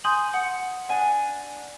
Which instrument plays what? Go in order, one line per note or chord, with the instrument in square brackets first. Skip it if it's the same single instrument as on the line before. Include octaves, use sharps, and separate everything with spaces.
[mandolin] G#5 C6 G6 [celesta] D#6 F#7
[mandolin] F#5
[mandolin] D4 G#5 [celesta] F#5